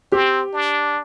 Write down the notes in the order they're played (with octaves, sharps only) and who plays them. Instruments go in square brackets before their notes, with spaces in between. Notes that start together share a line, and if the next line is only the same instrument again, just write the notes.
[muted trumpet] C4 [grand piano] G4
[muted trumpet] D4